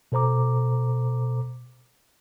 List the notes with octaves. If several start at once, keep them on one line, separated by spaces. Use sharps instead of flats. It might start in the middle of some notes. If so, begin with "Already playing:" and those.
B2 A4 C5 A#5 D6